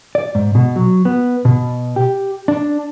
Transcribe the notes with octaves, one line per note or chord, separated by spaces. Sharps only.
D5
G#2
B2
F#3
B3
B2
G4
D4